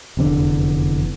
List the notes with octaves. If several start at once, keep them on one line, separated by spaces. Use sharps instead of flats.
F1 E2 D3